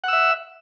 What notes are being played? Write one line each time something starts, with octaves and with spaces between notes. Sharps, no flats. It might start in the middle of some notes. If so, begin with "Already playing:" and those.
E5 F#5 E6